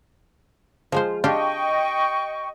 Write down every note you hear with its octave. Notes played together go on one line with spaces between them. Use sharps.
F3 G#3 F4 C5
D4 F4 G4 D#5 G5 C#6